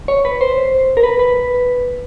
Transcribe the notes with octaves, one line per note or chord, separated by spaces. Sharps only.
C#5
B4
C5
A#4
B4
B4